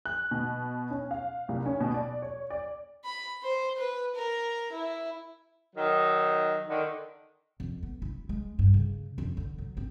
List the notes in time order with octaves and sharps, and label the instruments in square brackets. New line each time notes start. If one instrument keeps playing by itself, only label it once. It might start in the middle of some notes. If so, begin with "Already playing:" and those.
[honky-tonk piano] F#6
B2
C#4
F5
C2
C#4
B2
D5
C#5
D5
[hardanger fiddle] B5
C5
B4
A#4
E4
[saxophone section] D#3 F#3 D#4
D3 D#3
[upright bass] F2
B3
E4
G#3
G2
C#3
F2
D3
F#3
C4